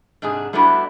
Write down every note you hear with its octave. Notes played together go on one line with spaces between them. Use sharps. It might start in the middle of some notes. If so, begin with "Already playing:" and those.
G#2 C3 D4 G#4
G3 A3 B3 D4 E4 F#4